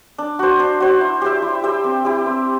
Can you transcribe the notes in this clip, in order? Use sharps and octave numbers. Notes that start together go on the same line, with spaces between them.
D4
F#4 C5
D4
F#4 C5
E4
G4 C5 E5
E4
G4 C5 E5
C4
E4 G4
C4